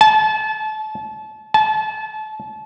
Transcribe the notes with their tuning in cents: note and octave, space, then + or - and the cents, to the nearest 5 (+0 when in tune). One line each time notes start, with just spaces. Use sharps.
A5 -30
A5 -30